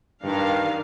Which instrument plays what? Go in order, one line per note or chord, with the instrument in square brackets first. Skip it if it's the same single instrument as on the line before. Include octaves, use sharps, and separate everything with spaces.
[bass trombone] G2 [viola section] D#3 D4 F5